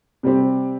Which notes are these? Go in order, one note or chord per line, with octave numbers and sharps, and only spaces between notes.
C3 G3 C4 G4